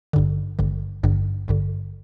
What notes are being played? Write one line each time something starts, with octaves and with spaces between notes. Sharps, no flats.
G#1 G2 D3
G#1 G2 D3
G#1 G2 D3
G#1 G2 D3